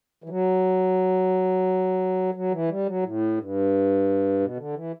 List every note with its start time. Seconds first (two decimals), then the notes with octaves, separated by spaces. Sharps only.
0.24 E3
0.29 F#3
2.35 F#3
2.51 E3
2.69 G3
2.86 F#3
3.03 A2
3.38 G2
4.40 B2
4.57 D3
4.74 E3